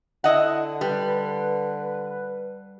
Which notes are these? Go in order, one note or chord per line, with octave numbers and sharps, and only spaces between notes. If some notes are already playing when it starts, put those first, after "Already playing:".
D3 E4 D#5 F#5
G3 B4